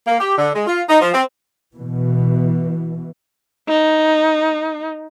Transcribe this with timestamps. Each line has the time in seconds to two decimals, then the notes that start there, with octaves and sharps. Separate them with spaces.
0.07 A#3
0.20 G4
0.38 D3
0.54 G#3
0.67 F4
0.89 D#4
1.02 F3
1.14 C4
1.74 B2 E3
3.68 D#4